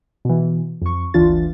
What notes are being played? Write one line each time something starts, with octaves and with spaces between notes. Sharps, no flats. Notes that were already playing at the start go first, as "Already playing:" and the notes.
B2 E3
F2 C#6
G1 D2 E3 D4 F4 A6